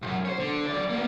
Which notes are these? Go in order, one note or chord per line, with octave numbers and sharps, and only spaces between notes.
C2 F#2
C5 C#5
D3
F#3 D5
A#3 B3